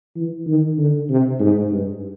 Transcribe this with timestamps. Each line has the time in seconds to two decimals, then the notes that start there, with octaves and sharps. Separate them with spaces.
0.16 E3
0.47 D#3
0.78 D3
1.10 C3
1.40 G#2
1.71 G2